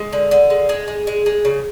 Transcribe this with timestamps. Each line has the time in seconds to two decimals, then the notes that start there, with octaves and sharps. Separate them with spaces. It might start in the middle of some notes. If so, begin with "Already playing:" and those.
Already playing: G#3
0.13 D3
0.31 D3
0.50 G#3
0.69 G#3 G#4
0.88 G#3
1.07 G#3
1.26 G#3
1.45 C#3